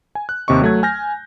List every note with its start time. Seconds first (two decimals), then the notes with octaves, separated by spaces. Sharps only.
0.15 G#5
0.29 F#6
0.48 D#2 C3 C4 D#5 C#6
0.62 F#3 A3 G#6
0.83 G#5 F6 G6 A#6